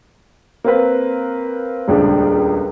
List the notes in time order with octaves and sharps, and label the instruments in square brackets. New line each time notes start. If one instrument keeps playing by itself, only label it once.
[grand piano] A#3 C4 B4
[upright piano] D#1 C#2 D4